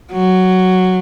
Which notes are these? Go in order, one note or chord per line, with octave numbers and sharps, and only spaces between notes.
F#3